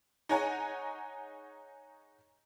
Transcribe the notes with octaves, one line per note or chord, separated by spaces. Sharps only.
D#4 G#4 C#5 F#5 G#5 A#5